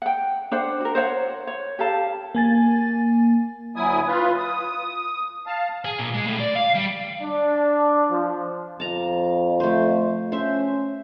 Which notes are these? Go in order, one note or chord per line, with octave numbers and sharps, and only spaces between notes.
F#5 G5
D4 C5 F#5
F#4 A#4
C5 C#5 F#5
C#5
G4 A4 F5 A5
A#3 G#5 A6
D2 F#3 E4 G#5 D#6
F4 B4
D#6
F5 A5
G#4
A#2
G#3
A2
D5
F5
G3
D4
F3
F2 A5 A#5
A3 C5
C#4 C5 E5